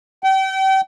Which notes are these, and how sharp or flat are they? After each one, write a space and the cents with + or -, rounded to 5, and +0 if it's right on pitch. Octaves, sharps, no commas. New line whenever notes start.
G5 -35